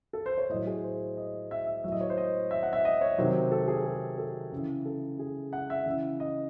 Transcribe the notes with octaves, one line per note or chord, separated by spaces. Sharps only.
A4
C5
C#5
A2 F#3 D#5
G#4
C5
D#5
E5
E5
A2 F#3 E5
D#5
C#5
C5
D#5
E5
F#5
E5
D#5
C#5
C3 D#3 F#3 C5
A4
G#4
G#4
A4
C#3 E3
A4
G#4
F#5
E5
C#3 E3
D#5